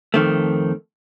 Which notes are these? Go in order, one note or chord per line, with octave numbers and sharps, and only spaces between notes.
F2 D#3 A3